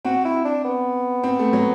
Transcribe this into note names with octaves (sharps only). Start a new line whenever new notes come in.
C4 F#4
E4
D4
B3
C4
A3
F#3